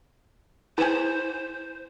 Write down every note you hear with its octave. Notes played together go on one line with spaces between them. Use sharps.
B3 E4 G#4 C5